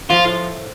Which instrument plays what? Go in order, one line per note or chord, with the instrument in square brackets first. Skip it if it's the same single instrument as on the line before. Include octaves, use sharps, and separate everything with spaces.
[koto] F3 [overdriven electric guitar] F4
[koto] A2